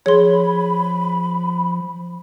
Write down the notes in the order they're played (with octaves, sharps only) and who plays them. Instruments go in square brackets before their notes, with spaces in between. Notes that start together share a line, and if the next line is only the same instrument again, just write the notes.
[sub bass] F3 [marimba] G#4 [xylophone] C#5 C6 [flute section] B5